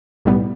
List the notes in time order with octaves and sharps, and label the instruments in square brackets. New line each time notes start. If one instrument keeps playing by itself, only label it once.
[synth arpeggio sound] B1 A2 G3 B3